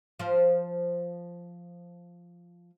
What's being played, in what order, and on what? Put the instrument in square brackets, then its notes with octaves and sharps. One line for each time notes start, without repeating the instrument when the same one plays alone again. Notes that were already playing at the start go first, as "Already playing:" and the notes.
[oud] F3 C5